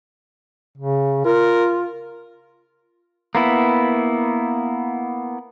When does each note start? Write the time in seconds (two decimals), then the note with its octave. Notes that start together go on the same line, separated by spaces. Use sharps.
0.77 C#3
1.25 F4 A#4
3.35 A#3 B3 E4